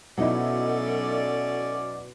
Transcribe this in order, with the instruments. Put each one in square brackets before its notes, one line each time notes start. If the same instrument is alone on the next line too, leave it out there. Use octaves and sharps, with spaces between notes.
[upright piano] B2 [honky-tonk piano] F#3 D#4 E4 [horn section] C#4 F#4 D5 [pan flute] A4